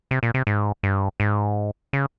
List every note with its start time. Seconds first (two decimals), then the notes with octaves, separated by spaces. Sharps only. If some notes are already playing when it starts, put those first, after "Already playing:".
0.11 C3
0.23 A#2
0.34 C3
0.47 G#2
0.83 G2
1.20 G#2
1.93 C#3